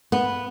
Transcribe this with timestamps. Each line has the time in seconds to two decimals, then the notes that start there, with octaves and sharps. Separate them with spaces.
0.12 B3